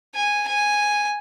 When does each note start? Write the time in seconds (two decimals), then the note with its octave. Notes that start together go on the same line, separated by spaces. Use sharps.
0.15 G#5
0.48 G#5